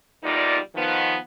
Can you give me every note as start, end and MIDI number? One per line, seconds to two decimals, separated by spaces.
0.24 0.58 40
0.24 0.58 46
0.24 0.58 55
0.24 0.58 63
0.24 0.58 65
0.24 0.58 74
0.76 1.15 51
0.76 1.15 53
0.76 1.15 59